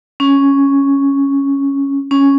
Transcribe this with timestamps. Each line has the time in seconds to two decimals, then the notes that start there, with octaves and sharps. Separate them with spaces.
0.20 C#4
2.11 C#4